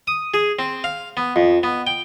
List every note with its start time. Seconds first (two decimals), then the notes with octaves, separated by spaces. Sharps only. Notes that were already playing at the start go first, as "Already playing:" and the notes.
0.07 D#6
0.34 G#4
0.59 C4
0.84 F5
1.17 B3
1.36 F2
1.63 B3
1.87 G5